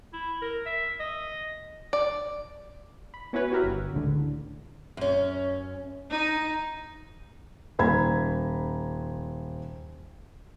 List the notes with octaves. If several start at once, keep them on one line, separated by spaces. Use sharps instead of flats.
E4
A#4
E5
D#5
D5
B5
B3 C#4 E4 F#4 B4 C#5
F#4 G4 A#4 B4 E5
G1
C#2 A2 D3
F#2 C#4
D#4
D#1 C5 A#5 B5 G#6